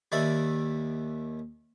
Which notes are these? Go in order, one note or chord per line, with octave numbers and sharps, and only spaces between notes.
D#2 D#3 D5 E5 B5